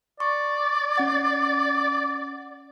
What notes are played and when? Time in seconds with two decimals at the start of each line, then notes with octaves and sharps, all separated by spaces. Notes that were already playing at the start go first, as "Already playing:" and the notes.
0.20 D5 C#6
0.96 C#4 F#5 A6